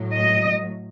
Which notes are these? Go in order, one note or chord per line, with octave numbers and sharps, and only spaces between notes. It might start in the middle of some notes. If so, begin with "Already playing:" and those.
Already playing: A2 F#3
D#5